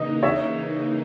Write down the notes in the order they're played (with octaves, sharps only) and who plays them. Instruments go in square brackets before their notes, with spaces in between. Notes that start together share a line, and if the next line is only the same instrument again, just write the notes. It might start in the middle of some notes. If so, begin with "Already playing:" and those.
Already playing: [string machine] C#3 E3 A#3 D#4 [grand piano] D#5
[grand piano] C#5 E5